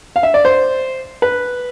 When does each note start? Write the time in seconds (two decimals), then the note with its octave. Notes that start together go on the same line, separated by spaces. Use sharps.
0.16 F5
0.23 E5
0.34 D5
0.45 C5
1.22 B4